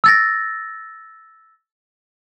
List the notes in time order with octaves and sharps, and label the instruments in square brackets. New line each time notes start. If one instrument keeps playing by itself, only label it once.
[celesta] E6 A6 A#6